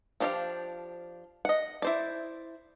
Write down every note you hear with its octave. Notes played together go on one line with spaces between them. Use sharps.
F3 D4 G4 C5 F5
D#5 F#5
E4 C5 D5